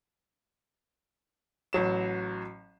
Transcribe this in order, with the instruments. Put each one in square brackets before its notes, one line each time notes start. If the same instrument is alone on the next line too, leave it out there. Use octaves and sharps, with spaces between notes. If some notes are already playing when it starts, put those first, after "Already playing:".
[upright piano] A1 F#3 E7